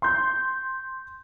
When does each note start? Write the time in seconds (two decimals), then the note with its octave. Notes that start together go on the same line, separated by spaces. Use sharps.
0.02 C6 G6